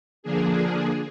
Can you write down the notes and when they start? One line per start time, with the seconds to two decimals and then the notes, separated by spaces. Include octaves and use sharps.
0.23 D3 F3 A#3 D4 G#4